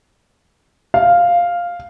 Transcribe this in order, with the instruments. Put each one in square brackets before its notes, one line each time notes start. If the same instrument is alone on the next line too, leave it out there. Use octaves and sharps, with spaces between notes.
[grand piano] F5